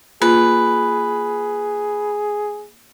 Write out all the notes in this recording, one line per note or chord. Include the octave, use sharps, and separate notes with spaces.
A#3 F4 G#4 B4